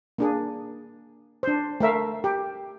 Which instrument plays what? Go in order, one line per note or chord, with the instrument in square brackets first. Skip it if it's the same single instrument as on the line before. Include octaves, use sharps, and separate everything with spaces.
[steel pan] A#3 D4 G#4
D4 C5
A3 A#4 E5 F5
G4